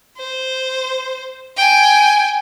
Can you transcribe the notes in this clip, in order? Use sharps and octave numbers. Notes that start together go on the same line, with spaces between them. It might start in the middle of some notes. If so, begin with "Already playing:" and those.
C5
G5 G#5